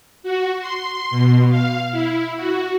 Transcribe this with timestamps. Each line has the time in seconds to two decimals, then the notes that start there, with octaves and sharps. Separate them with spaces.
0.23 F#4
0.60 C6
1.11 B2
1.49 F5
1.91 E4
2.36 F#4